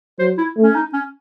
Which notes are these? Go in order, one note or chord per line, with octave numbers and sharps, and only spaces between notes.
F#3 C5
E4
A3
C#4
D#4
C#4